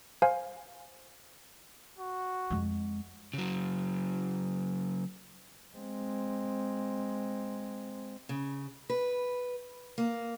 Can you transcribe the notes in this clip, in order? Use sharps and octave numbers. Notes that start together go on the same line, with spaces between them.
C5 F5 G#5
F#4
F2 G#3
C#3 F#3
G#3 C4
C#3
B4
A#3